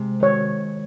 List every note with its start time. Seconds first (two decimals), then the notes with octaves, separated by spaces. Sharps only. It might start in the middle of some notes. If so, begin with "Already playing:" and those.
Already playing: C3 G#3
0.20 D#3 C#5